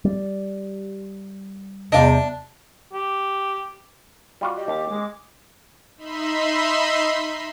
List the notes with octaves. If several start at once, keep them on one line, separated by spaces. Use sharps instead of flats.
G3
E2 C3 D4 D#5 F5
G4
G3 F4 F#4
G4 D#5
D#2 D6
G#3
D#4 E5 B5 C6